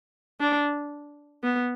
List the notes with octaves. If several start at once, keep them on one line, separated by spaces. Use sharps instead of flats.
D4
B3